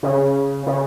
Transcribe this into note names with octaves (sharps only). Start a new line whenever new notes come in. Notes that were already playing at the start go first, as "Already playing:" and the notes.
C#3
C#3